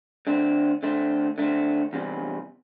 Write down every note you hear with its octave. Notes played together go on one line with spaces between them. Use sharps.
D3 A3 C4
D3 A3 C4
D3 A3 C4
E2 C3 E3 G3